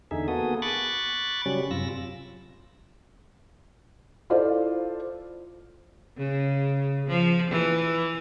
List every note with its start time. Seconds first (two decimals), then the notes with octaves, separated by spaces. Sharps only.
0.11 E2 D3 D#4 G#4 E5
0.28 A#3 B3 F#4 G#4 A4 D#6
0.62 B5 C#6 D6 F#6 A6
1.46 C#3 F#3 G3 C#4
1.71 F#2 C3 F4 E6 A#6
4.30 E4 F4 A4 C5 D5 F5
6.18 C#3
7.07 F3
7.51 E3